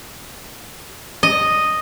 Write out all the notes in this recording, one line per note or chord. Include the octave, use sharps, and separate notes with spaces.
D#5